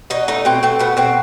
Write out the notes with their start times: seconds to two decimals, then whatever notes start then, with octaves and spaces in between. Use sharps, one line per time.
0.10 B2 D#4
0.28 A3 D#4
0.45 B2 C4
0.63 A3 C4
0.79 B2 B3
0.97 B2 C4